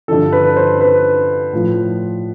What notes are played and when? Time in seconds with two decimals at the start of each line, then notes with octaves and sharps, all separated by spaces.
0.08 G2 D3 F3 A4
0.33 B4
0.56 C5
0.81 B4
1.53 A2 F3